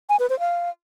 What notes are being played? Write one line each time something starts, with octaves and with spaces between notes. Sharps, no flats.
G#5
B4
C5
F5